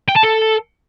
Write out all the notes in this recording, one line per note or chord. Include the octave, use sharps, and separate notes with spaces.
G5
A5
A4